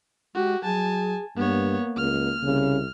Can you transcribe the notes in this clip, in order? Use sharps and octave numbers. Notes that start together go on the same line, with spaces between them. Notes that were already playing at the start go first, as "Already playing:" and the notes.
G#3 F#4 G4
F#3 G#4 G#5 A5
G2 A#3 B3 C#5
C#2 F6
C2 C#3